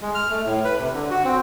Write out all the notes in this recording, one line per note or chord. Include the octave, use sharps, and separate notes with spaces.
G#3
F6
A3
A2
B4
C3
D3
F#4
C4